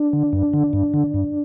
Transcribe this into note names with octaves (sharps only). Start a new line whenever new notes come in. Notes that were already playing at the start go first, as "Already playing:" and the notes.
Already playing: D4
D3
F#2
D3
G2
D3
G2